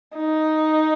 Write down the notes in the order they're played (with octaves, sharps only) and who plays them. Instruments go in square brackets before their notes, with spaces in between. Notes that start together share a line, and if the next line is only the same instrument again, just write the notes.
[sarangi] D#4